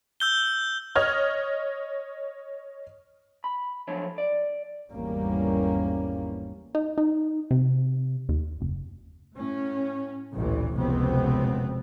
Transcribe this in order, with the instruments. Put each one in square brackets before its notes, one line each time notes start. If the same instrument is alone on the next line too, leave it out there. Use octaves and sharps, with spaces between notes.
[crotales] E6 G6 G7
[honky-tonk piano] C#5 D#5 F6 G#6
[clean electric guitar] B5
F3 F#3 A3 D4 C#5
D5
[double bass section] G#1 E2 G3 A#3 C#4
[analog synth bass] D#4
D#4
C3
D#2
F#1
[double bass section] A2 C#4
A1 D2 A#2 E3
F1 C#2 B2 B3 C4